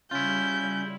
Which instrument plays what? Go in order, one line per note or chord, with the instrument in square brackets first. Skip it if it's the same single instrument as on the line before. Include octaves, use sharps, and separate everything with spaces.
[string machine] C#3 G3 [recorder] C#4 [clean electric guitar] E4 F4 [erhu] G6